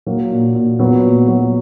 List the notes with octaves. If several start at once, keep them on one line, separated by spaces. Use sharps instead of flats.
F#3 A#3
A#2
A#2
F#3 B3
A#2
F#3